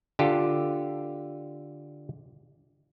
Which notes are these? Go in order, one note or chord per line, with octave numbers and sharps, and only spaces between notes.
D3 F4 G4 A4